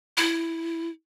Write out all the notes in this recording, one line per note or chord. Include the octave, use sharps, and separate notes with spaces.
E4